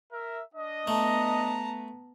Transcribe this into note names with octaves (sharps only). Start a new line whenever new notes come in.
A#4 E5
D4 D#5
A3 B3 A5 A#5